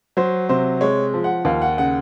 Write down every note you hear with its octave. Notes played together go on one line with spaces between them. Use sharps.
F#3 C5
C3 C5
G#3 C#5
F3
F#5
D#2 F5
F#5
C#3 F#5